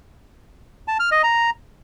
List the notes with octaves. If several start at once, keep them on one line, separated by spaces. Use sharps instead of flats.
A5
F6
D#5
A#5